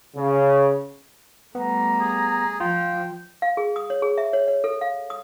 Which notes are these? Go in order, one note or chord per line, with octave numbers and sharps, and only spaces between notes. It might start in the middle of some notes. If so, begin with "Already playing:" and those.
C#3
G3 A3 B3 A#5
G#4
F3 F4 G5
F5
G#4
D#6
C#5
G#4
E5
C#5
C#5
A4
F5
D#6